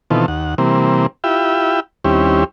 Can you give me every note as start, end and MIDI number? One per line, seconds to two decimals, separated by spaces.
0.10 0.26 47
0.10 0.26 51
0.10 0.26 52
0.10 0.26 60
0.10 0.26 65
0.10 0.26 69
0.28 0.55 39
0.28 0.55 78
0.58 1.06 48
0.58 1.06 52
0.58 1.06 55
0.58 1.06 58
0.58 1.06 60
1.24 1.80 64
1.24 1.80 65
1.24 1.80 67
1.24 1.80 76
1.24 1.80 79
1.24 1.80 83
2.05 2.44 39
2.05 2.44 55
2.05 2.44 60
2.05 2.44 61
2.05 2.44 64
2.05 2.44 67